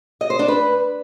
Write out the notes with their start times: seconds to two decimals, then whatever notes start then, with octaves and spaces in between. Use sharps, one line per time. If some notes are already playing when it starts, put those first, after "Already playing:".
0.21 D#5
0.30 C5
0.39 D4
0.48 B4